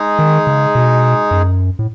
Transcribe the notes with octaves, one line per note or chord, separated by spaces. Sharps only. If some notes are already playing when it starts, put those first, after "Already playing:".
Already playing: G#3 D#4 G#4
D#3
C#3
B2
F#2
A2